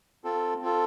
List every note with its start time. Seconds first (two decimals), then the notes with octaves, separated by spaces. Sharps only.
0.24 C4 F4 A4
0.61 C4 F4 A4